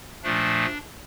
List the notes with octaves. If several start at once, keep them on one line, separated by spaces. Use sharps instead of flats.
A#2 F3 A3 D4